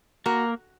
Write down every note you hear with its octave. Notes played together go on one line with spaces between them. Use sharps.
A#3 F#4 A#4